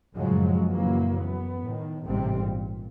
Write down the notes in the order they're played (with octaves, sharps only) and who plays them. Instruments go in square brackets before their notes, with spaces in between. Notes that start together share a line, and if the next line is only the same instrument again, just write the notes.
[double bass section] F#2 A2 C#3 F3 F#3 G#3
F#2 A#2 C#3 E3 F#3 A#3
F#2 B3
A2 D#3
A1 G#2 C3 G3 C4
A#2